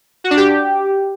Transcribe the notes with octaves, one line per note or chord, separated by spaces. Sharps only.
F#4
D4
G4